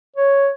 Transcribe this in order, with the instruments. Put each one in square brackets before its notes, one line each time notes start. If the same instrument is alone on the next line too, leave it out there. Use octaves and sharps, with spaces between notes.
[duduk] C#5